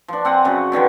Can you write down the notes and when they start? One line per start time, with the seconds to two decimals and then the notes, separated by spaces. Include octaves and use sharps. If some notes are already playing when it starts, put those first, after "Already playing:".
0.08 F3 D4
0.25 C4 F#5 G#5
0.45 F#2 C#3
0.72 B2 D3 D#3 F3